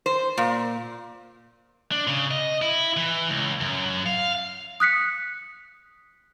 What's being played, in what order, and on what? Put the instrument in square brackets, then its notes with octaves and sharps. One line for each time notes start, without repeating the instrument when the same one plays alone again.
[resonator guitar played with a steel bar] C5
A#2
[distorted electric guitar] D4
C#3
D#5
E4
E3
C#2
F#2
F5
[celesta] D#6 F#6 B6 C#7